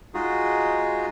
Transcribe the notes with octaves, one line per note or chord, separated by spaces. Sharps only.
G#3 D#4 F4 F#4 G#4